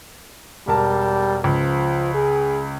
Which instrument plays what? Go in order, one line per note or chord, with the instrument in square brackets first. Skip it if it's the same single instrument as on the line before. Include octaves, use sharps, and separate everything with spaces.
[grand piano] E1 A#4 A5 [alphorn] G3
[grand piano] C#2 [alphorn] F3
[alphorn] G#4